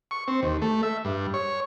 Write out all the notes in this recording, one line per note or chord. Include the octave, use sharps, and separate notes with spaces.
C#6
C4
D#2
A3
E5
G2
C#5